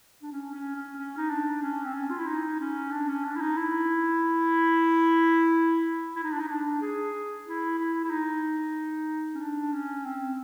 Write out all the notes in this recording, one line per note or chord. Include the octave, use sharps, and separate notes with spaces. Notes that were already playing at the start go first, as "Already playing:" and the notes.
D4
C#4
C#4
C#4
C#4
D#4
D4
C#4
C4
C#4
F4
E4
D#4
C#4
D4
C#4
D4
E4
D#4
E4
E4
D#4
D4
D#4
D4
G#4
E4
E4
E4
D#4
C#4
D4
C#4
C4